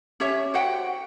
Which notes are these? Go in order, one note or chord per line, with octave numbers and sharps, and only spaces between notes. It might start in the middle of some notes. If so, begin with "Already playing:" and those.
C#4 G4 C#5 E5
F#4 C5 F#5 G5